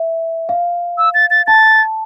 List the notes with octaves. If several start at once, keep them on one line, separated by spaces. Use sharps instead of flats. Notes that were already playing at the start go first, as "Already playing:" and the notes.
Already playing: E5
F5
E6
A6
A6
A5 A6